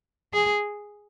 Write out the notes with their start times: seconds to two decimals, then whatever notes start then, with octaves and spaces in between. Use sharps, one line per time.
0.33 G#4